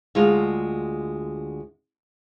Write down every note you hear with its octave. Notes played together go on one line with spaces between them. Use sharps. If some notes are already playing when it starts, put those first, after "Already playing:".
D2 G#3 F4